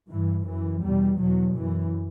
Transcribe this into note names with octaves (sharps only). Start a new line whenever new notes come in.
G2 E3
F#2 E3
E2 B2 G3
E2 B2 F#3
F#2 E3